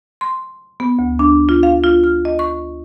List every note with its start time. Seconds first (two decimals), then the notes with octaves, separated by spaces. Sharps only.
0.21 C6
0.80 B3
0.99 D2
1.19 D4
1.49 F4
1.63 F5
1.84 F4
2.04 F6
2.25 D#5
2.39 C#6